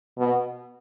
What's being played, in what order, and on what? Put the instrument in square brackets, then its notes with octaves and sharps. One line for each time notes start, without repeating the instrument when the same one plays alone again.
[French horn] B2